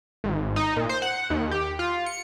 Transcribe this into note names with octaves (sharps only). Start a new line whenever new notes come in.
G#1
D#4
A#2
C5
F#5
D#2
G4
F4
C#7